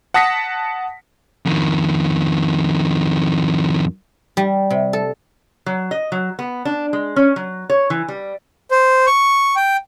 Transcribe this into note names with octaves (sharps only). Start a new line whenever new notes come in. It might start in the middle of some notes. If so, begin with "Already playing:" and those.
F#5 A5 D#6 A#6 B6 C#7
F2 D#3
G3
C3
A4
F#3
D#5
F#3
B3
D4
G#3
C#4
F#3
C#5
E3
G3
C5
C#6
G5